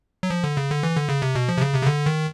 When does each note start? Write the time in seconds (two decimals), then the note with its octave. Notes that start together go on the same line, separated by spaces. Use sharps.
0.23 F#3
0.30 F3
0.44 D3
0.57 C#3
0.70 D3
0.83 E3
0.96 D3
1.09 C#3
1.22 C3
1.35 B2
1.49 F3
1.57 C3
1.61 C#3
1.74 C3
1.82 C#3
1.87 D3
2.06 D#3